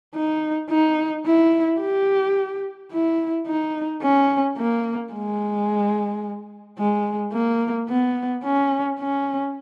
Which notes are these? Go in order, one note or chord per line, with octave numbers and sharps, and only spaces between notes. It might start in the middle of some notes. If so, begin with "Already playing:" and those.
D#4
D#4
E4
G4
E4
D#4
C#4
A#3
G#3
G#3
A#3
B3
C#4
C#4